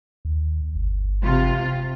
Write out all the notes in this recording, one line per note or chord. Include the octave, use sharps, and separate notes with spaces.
D#2
G1
C3 F4